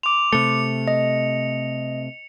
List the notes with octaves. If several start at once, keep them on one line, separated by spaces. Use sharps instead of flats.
C6 D6 F7
C3 A3 C#7
D#5